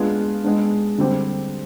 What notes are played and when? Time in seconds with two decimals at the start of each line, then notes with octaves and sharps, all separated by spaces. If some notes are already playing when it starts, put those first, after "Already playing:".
Already playing: G#3 B3 D4 F4 G#4
0.44 G#3 B3 D4
0.98 D3 G3 C4 G4 C5